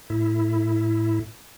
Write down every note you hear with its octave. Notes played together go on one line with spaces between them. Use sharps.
A2 E4